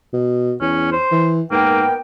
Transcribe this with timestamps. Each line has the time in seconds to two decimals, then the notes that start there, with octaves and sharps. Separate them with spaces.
0.13 B2
0.61 E2 C#4
0.92 C5
1.12 E3
1.51 G#2 A#3 B3 A#4 G5